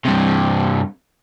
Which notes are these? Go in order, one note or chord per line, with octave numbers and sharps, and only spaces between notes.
G2 C3